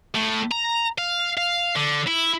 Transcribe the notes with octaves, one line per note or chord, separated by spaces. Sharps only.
A2
A#5
F5
F5
D3
E4